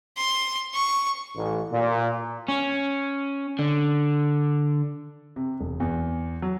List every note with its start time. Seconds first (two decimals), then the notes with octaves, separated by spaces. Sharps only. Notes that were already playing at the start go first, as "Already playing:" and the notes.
0.17 C6
0.74 C#6
1.35 A1
1.71 A#2
2.48 C#4
3.59 D3
5.36 C3
5.60 E1
5.80 E2
6.42 F#3